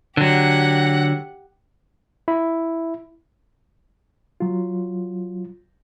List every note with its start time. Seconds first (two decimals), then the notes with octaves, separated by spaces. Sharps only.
0.17 D3 F#3 G4 F#5
2.28 E4
4.40 F#3 F4